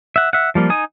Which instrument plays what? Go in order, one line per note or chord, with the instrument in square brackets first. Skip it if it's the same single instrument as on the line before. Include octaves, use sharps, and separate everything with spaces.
[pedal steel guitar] E5 F#5
E5 F#5
F3 G3 A#3 F4
D#4 G#5 D#6